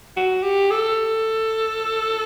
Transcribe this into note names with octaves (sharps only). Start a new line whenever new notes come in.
F#4
G4
A4